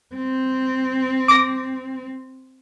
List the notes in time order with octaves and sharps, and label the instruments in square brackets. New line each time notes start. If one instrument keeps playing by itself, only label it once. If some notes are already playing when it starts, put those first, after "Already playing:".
[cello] C4
[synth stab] D6 A#6